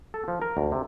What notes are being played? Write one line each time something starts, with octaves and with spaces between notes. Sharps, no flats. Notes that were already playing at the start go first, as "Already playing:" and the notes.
A4
F3
A#4
D2
C3